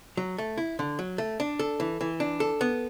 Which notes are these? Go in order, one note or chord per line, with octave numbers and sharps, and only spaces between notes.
F#3
A3
E4
D3
F#3
A3
D4
A4
E3
E3
D4
A4
B3